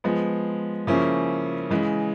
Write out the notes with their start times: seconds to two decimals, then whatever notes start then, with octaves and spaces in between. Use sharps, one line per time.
0.04 F3 G#3 B3
0.87 C#3 F3 A#3 C#4 E4
1.70 C#3 E3 G#3